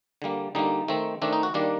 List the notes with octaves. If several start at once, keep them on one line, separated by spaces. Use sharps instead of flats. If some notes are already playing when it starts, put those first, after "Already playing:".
D3 G3 A#3
D3 G3 A#3 D#4
D#3 A3 C4
D#3 A3 C4 D4
D#4
F#4
D#3 G3 A#3 D4